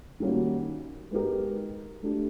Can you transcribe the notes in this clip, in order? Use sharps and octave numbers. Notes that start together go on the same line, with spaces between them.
D#3 G3 A#3 C#4 F#4
G#3 B3 D#4 G4 A#4
A3 D4 G4